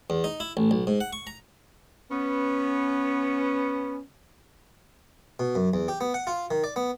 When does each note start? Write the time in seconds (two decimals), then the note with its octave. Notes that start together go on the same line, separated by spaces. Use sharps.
0.10 E2
0.24 D#4
0.40 E4
0.57 A1
0.71 B1
0.87 G#2
1.01 F#5
1.13 C#6
1.27 A#5
2.11 B3 C#4
5.40 B2
5.55 F#2
5.74 E2
5.88 G4
6.01 B3
6.14 F#5
6.27 F4
6.51 D#3
6.64 D5
6.76 B3